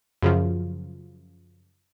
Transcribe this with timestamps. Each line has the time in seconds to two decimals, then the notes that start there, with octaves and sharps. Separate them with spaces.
0.22 F#2 C#3 F3